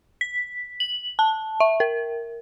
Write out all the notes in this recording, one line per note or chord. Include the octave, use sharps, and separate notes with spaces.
B6
F#7
A5
E5
A#4